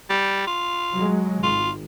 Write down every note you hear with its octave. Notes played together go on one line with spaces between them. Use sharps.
G3
F4
F#3 G#3
G#1 F4